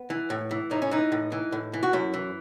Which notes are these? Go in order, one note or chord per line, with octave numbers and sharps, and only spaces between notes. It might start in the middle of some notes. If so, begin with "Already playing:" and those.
Already playing: B3
E3
A2
E3
A2 D#4
C#4
E3 D#4
A2
E3
A2
E3
F#4
F#2 E4
E3